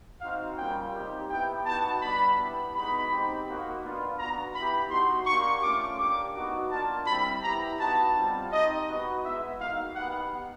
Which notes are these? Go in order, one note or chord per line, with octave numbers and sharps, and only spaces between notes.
C4 D#4 F#4 F5
G3 A#3 C#4 F4 G5
C4 D#4 G4
B3 E4 G4 G5
B3 D#4 F#4 A5
G3 B3 D4 B5
B3 E4 G4
G#3 B3 D#4 F#4 B5
C4 D#4 G4
A#3 D#4 F#4
B3 D4 F4
B3 D4 F#4 A#5
B3 E4 G4 B5
B3 D#4 F#4 C6
A#3 D4 G4 C#6
A3 C#4 F4 D6
A#3 D4 G4 D6
B3 D#4 F#4
A#3 D4 F4 A5
G3 C4 E4 B5
B3 E4 G4 A#5
B3 D#4 F#4 A5
G3 C4 F4
C4 D#4 G4 D#5
B3 D#4 F#4
G#3 B3 E4 E5
A#3 D#4 F#4 F5
B3 D#4 G4 F#5